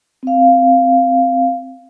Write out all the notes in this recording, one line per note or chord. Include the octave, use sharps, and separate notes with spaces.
C4 F5